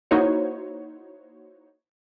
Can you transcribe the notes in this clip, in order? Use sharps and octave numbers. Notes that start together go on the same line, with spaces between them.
A#3 D#4 E4 F#4 C5 C#5